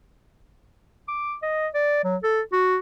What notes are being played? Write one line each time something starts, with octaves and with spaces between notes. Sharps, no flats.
D6
D#5
D5
F#3
A4
F#4